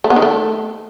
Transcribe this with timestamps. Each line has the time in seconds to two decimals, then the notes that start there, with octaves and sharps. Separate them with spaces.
0.04 A3
0.10 B3
0.16 D#3
0.22 A3